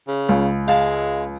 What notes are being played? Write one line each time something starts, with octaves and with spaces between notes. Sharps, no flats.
C#3
C#2
G#3 F5 A5